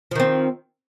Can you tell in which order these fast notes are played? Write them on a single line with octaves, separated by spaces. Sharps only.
F3 D#3 C4